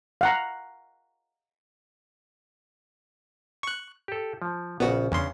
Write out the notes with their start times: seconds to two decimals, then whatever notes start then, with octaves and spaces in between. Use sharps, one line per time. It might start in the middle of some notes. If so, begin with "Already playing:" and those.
0.21 F5 F#5 A#5
3.63 C#6 F#6
4.08 G4 A4
4.42 F3
4.80 A#1 C#3 B3 F#4
5.12 E2 C#3 C#4 D4 C6